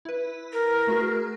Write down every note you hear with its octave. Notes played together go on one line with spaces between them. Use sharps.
E4 B4
A#4
A3 F#4 G#4